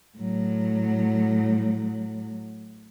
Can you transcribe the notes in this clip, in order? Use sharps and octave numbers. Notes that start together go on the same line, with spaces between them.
A2 F#3